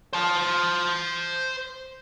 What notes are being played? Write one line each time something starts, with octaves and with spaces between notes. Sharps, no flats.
C5 A5